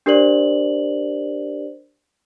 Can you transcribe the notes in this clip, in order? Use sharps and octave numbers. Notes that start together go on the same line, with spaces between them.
D4 G4 A#4 C5 D5 F#7